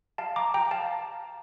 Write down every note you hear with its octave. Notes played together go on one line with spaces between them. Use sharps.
F5 A5
A#5 D6
G5 A#5
F5 A5